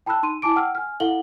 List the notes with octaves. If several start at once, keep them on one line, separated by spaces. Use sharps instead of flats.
G5 A5 B5 E6 F#6
D#4 C6 D#7
E4 G#5 A5 D6 D7
F#5 G5 E6 F6
G#5 F6
E4 A4 F5 F#5 F#7 G7